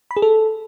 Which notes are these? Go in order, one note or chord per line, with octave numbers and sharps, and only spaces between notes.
B5
G#4
A4